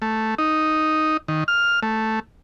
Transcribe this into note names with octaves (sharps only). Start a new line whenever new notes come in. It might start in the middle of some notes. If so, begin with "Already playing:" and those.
A3
D#4
D#3
F6
A3